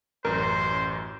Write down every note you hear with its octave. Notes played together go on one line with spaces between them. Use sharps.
A1 F#2 A#4 C5